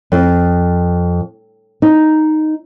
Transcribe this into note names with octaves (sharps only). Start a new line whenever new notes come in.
F2
D#4